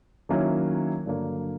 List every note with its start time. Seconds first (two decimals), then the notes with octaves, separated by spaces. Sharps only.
0.29 D#3 F#3 A#3 C#4 E4
1.06 G2 D3 F#3 A#3